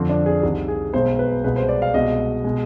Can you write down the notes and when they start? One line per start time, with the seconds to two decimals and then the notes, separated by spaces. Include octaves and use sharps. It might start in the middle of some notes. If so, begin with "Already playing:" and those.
Already playing: F2 D3 F3 C4
0.09 D4
0.26 G#4
0.43 C2 C3 D#3
0.68 G#4
0.93 B1 B2 G#3 C5
1.19 B4
1.44 C2 B2 G#3 B4
1.56 C5
1.69 D5
1.82 F5
1.94 C2 B2 G#3 D#5
2.44 B2 G#3